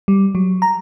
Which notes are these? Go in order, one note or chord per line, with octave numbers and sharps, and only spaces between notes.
G3
F#3
A#5